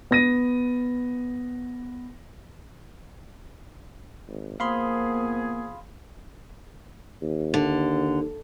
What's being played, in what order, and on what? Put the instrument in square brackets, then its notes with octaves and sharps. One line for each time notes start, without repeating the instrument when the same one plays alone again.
[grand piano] B3 A#6 D#7
[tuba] G#1
[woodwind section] F3 B3 G#4 [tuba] A#3 [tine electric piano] F5 B5 C6
[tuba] D#2
[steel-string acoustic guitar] D3